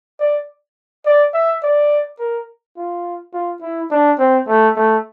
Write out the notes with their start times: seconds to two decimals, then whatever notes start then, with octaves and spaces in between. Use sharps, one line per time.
0.20 D5
1.06 D5
1.34 E5
1.63 D5
2.19 A#4
2.77 F4
3.33 F4
3.61 E4
3.91 D4
4.19 C4
4.47 A3
4.76 A3